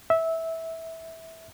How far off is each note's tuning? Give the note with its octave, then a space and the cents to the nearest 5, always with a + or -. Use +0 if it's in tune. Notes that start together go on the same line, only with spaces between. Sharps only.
E5 -15